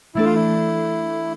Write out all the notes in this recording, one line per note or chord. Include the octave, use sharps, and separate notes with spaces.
E3 A3 D4 E4 A4
F4
E4